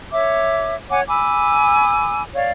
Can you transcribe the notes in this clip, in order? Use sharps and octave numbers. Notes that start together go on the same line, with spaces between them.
C#5 E5 D6
C#5 F#5 G#5 D6
G#5 B5 D6 E6
C#5 D5 F5